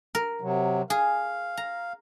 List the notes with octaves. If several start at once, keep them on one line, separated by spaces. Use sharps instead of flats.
A#4
C3 F#3
G#4 F5
A#5